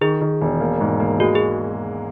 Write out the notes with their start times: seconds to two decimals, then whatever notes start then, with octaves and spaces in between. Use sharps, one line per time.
0.01 D#3 G#4
0.21 D#3
0.41 E1
0.61 A#3
0.81 G#2
1.00 A#3
1.20 G#3 F#4
1.35 G#4